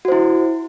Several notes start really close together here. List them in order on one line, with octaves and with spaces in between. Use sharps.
F#4 C5 E4